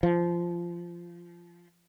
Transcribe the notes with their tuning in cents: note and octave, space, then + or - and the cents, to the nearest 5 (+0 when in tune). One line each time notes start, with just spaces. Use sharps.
F3 -15